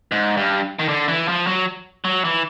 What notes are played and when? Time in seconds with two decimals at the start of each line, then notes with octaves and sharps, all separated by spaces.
0.12 G#2
0.37 G2
0.79 D#3
0.88 D3
1.08 E3
1.28 F3
1.47 F#3
2.05 F#3
2.25 E3